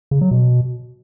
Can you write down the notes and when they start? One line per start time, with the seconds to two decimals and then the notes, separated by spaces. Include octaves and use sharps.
0.11 C#3
0.21 F#3
0.31 B2